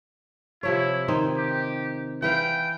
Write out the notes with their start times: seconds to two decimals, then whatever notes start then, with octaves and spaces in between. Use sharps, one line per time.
0.63 C3 F3 E4 C#5
1.08 D#3 C4 D#4
1.37 G4
2.22 E3 B4 F5 G5